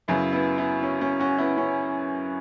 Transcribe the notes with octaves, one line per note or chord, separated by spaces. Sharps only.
F#2 C#3 F#3 B3 E4
B3 E4
B3 E4
C#4
C#4
C#4 F#4
B3 E4
C#4